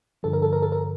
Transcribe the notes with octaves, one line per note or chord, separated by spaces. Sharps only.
G2 D3 F3 A4
A#4
A4
A#4
A4
A#4